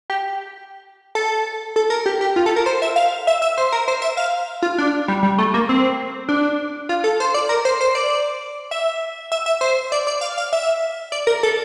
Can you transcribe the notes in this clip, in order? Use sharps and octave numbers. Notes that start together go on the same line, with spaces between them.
G4
A4
A4
A#4
G4
G4
F4
A4
A#4
C5
E5
F5
E5
E5
C5
A#4
C5
E5
F5
F4
D4
G3
G3
A3
A#3
C4
D4
F4
A4
C5
D5
A#4
C5
C5
D5
E5
E5
E5
C5
D5
D5
F5
F5
E5
D5
A#4
A4